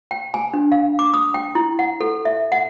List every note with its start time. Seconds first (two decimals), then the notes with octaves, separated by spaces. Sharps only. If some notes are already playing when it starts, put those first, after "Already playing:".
0.11 G5
0.34 G#5
0.54 D4
0.72 F5
0.99 D6
1.14 D#6
1.34 G5
1.55 E4
1.79 F#5
2.01 A4
2.25 E5
2.52 F#5